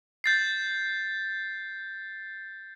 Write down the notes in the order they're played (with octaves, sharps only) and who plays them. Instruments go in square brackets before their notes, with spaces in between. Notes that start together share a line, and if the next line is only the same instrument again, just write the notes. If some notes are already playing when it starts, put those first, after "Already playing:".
[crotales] G6 A6 C7